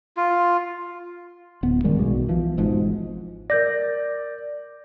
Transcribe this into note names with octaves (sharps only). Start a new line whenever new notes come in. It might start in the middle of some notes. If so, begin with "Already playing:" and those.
F4
D1 B3
F#2 D#3 G3 G#3
B1 B2
E3 F3
G#1 G#2 B2 F3
A#4 D5 G6 A#6